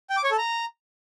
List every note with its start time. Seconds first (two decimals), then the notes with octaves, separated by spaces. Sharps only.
0.10 G5
0.17 D6
0.24 C#5
0.31 A4
0.38 A#5